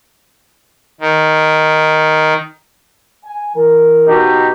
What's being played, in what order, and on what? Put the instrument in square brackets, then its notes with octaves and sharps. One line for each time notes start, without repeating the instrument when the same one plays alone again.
[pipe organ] D#3
[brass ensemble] G#5
E3 A#4
[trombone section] B2 D#4 G4